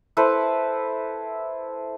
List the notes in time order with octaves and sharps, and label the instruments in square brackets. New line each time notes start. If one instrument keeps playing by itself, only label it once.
[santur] E4 A4 B4 C5